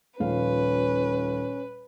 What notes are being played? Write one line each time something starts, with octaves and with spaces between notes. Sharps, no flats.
D#1 F3 C#4 B4 F5